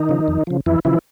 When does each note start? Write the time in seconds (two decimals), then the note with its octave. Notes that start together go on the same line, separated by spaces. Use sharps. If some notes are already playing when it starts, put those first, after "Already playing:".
Already playing: D#3 D#4
0.09 C#3 F3
0.28 F2
0.47 C#3 F3
0.66 F2 E3 E4
0.85 C#3 E3 F3 E4